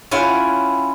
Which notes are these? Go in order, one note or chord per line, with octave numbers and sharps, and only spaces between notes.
C#4 E4 F4 F#5 G5